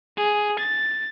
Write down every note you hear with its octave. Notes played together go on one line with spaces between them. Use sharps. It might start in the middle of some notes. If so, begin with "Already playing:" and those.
G#4
A6